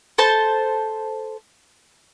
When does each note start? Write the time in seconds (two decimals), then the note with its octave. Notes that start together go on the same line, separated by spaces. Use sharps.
0.18 A4 C5 A5